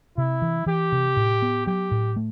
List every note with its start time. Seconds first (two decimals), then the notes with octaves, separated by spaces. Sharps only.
0.17 C3 E4
0.42 E3
0.66 E3 G4
0.92 C3
1.17 A2
1.42 B3
1.67 F#3 G4
1.91 A2
2.16 A3